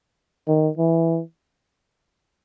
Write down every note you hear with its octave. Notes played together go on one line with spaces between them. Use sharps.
D#3
E3